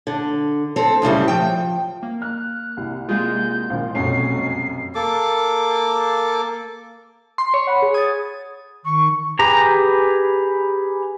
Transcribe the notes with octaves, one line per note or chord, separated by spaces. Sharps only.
D3
C4 A4
D2 A2 C#3 G3
F3 G5
A#3
F6 F#6
C2
G#3 A#3 F4 G#4 G6
A#1 A#2 F5
F1 B1 F#2 C#4 F#4 C7
A#3 A4 D6
C6
C#5
F#5 B5
G#4
D#6 G#6 A6
D#3 C#6
G4 G#4 B4 A#5